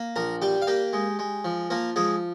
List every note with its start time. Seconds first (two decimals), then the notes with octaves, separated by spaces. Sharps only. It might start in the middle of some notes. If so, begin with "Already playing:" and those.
Already playing: A#3
0.16 A#1 A#4 A#5
0.42 G3 G4 G5
0.62 F5
0.67 A#3 G4 G5
0.93 G#3
1.19 G#3
1.45 F3
1.70 F3 A#3 A#4
1.96 F3 G#3 G#4